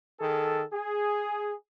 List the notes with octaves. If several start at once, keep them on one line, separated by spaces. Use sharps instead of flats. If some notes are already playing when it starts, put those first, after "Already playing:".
D#3 G#4 A4
G#4